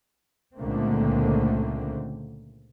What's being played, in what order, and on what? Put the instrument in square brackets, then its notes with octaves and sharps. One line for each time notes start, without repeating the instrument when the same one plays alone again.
[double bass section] C#2 A#2 D3 A3 A#3 C4